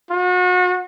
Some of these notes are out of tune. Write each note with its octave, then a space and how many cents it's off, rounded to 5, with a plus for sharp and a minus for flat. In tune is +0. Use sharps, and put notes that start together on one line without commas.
F#4 -35